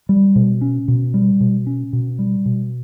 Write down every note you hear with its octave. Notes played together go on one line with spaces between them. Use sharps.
G3
B2
C#4
B2
G3
B2
C#4
B2
G3
B2